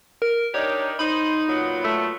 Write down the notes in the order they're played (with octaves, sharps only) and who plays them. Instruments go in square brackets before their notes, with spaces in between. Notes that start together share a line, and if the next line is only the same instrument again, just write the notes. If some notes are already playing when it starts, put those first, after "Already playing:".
[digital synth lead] A#4
[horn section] D4 D#4 [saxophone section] G4 A#4 D5 [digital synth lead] C#5
[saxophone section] D#4 [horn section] C5 [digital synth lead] B5
[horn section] A#2 F#3 B3
[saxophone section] A3